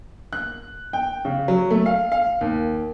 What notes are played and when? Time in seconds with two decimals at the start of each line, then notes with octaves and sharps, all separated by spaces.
0.33 F#6
0.93 G5
1.25 C#3
1.48 F#3
1.71 A3
1.86 F5
2.12 F5
2.41 D#2